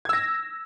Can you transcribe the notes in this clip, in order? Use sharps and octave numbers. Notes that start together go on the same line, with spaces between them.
E6 G#6 A#6